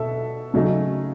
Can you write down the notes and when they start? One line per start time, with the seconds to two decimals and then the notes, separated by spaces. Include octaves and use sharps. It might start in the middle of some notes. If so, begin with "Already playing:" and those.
Already playing: B2 A4 E5
0.54 C#3 F#3 A3 D#4